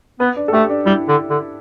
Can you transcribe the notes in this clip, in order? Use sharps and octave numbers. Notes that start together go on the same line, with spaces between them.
B3 B4
D4
A4
A3 G4
D4
G3 E4
D3
D3